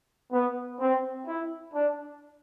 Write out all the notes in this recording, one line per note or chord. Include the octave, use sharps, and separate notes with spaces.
B3
C4
E4
D4